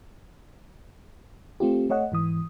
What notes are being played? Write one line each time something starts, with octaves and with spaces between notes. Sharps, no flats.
A3 C4 F4 G4
A3 C#5 D#5 F#5
G#2 E3 D#6